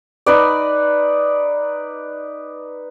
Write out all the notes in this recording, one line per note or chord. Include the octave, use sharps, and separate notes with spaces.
D#4 B4 D5